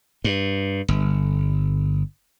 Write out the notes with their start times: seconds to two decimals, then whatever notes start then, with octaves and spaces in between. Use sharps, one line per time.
0.24 G2
0.88 G1